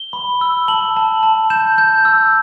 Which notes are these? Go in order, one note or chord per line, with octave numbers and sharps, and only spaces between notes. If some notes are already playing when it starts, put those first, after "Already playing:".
Already playing: G7
B5
E6
A5 F#7
A5
A5
G6 E7
G6
E6